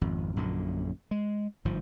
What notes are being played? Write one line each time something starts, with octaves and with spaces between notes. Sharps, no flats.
G#1 F2
A#1 F#2 A#2 D3
G#3
G1 G#2 F3